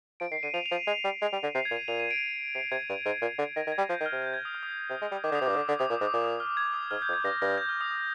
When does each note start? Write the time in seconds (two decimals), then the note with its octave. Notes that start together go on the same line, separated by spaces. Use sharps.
0.20 F3 D7
0.31 D#3 C7
0.43 D3 D#7
0.54 F3 F7
0.66 F7
0.71 F3
0.76 D#7
0.87 G#3
1.04 G3
1.21 G#3
1.32 G3
1.43 D3
1.55 C3 C7
1.65 G#6
1.71 A#2
1.76 D#7
1.88 A#2 F7
2.00 D#7
2.11 D7
2.54 C3 C7
2.71 C3 G#6
2.89 G2
3.06 G#2
3.22 A#2
3.38 D3
3.56 D#3 A#6
3.67 D#3
3.72 G#6
3.78 G3
3.89 F3 G6
4.01 D#3
4.06 F6
4.12 C3
4.22 G6
4.34 G#6
4.45 D#6
4.55 F6
4.63 D#6
4.90 C3
5.01 G#3
5.12 G3
5.24 D#3 D6
5.31 D3
5.35 D#6
5.41 C3
5.46 G2 D6
5.56 D3 D#6
5.68 D3 D#6
5.79 C3 D#6
5.90 A#2 D6
6.01 G#2
6.07 D6
6.13 A#2
6.24 D#6
6.40 F6
6.57 G#6
6.74 D#6
6.91 G#2 F6
7.02 G6
7.08 F2
7.13 G#6
7.24 G2 A#6
7.42 G2 A#6
7.58 G6
7.69 F6
7.81 D#6
7.91 D#6